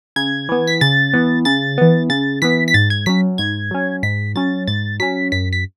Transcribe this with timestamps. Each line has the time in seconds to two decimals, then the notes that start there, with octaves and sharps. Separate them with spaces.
0.16 C#3 G#6
0.49 E3 B3
0.67 B6
0.81 C#3 A6
1.14 E3 B3
1.45 C#3 A6
1.78 E3 B3
2.10 C#3 A6
2.42 E3 B3 B6
2.68 B6
2.74 G#2 A6
2.90 G#6
3.06 F#3 C#4 B6
3.38 G#2 G#6
3.71 F#3 C#4
4.03 G#2 B6
4.35 F#3 C#4 A6
4.67 G#2 A6
5.00 F#3 C#4 B6
5.32 F#2 B6
5.53 B6